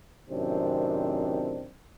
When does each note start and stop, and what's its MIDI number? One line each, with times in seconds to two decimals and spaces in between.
0.30 1.69 42
0.30 1.69 45
0.30 1.69 48
0.30 1.69 51
0.30 1.69 60
0.30 1.69 62